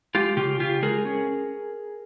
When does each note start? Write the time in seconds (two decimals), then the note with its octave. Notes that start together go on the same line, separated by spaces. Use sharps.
0.15 G#3 F4 G4
0.37 C#3 F4 G4
0.60 C#3 F4 G4
0.82 G#3 G#4 A#4
1.05 C#4